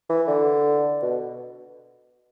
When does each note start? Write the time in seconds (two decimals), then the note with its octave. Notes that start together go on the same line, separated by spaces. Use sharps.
0.10 E3
0.28 D3
1.02 B2